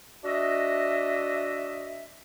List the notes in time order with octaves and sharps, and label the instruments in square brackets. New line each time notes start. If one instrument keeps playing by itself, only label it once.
[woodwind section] D4 F#4 D#5 E5